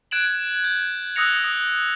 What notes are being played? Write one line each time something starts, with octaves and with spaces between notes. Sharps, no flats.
F#6 G#6 D7 E7 F#7
G6
D#6 E6 F#6 A#6 C#7 F7
D#6